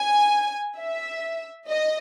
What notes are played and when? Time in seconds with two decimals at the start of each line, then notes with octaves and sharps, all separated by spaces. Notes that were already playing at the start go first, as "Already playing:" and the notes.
Already playing: G#5
0.78 E5
1.70 D#5